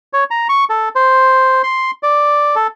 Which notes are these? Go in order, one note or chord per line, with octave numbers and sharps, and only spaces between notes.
C#5
A#5
C#6
A4
C5
C6
D5
A4